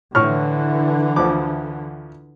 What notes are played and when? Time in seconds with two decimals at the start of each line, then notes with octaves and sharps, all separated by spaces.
0.15 A2 D3 E3 C#6 F6
1.16 D2 F3 D6